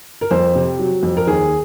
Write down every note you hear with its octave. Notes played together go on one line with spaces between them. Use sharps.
A#4
F2 C5
C3
F#3
F2
A#4
D#2 G#4